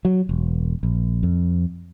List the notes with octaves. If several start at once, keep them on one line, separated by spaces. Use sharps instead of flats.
F#3
E1
A#1
F2